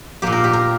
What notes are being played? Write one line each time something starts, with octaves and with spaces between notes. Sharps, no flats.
A#2 A#3 G4
A#4
G4
A#4